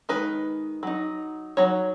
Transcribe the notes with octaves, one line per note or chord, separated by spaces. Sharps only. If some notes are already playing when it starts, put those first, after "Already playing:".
D#3 G#3 D#4 B4
F#3 D#4
F#3 D#4 C#5